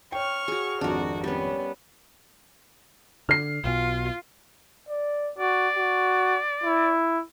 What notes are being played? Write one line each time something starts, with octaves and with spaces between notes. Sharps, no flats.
C#5 G5 C#6 F6
F#4 G#4
G#1 F2 D4 F#4 A#4
G3 B3 C#4
D3 F6 C7
B1 B2 F4
D5
F#4 D5
F#4
E4